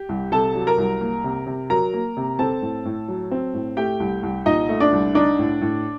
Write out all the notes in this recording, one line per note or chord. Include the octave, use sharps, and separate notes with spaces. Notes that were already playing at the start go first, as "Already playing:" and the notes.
Already playing: G4
C2
C3 A4 A5
F#3
A#4 A#5
C2
A#3
C3
C3
F#3 A#4 A#5
A#3
C3
C4 A4 A5
A2
A2
F#3
C4
A2
A3 G4 G5
C2
C2
A#2 D#4 D#5
A3
D4 D5
C2
D4 D#4 D5
A2
A2